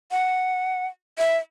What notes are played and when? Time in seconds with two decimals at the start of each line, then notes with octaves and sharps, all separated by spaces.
0.11 F#5
1.18 E5